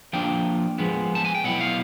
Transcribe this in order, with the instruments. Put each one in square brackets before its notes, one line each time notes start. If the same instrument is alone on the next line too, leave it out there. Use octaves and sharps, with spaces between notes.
[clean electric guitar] F3 A#3 D4 G5
F3 G#3 B3
A5
G#5
G5
B2 F#3 B3 E4 F#5
F5